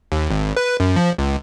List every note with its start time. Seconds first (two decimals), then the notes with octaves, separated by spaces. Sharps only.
0.12 D#2
0.30 G#1
0.57 B4
0.80 F#2
0.96 F3
1.18 C#2